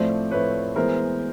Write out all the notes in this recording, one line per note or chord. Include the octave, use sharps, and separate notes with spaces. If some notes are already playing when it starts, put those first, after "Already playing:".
Already playing: A2 F3 A3 C4 C5 D5
A2 F3 A3 C4 B4 C#5
E3 G#3 B3 A#4 C5